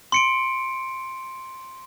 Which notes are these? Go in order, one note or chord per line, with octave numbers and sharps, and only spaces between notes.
C6 C#7 D7